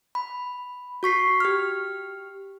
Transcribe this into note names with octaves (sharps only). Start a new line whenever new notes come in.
B5
F#4 C#6 B6 C7
G4 F6